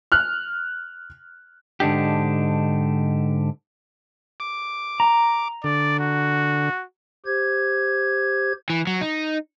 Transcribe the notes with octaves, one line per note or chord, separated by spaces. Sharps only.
F6 F#6
G#2 D3 D4 D#4 G4
D6
A#5
D3 D5
F#4
G4 C5 G#6
E3
F#3
D#4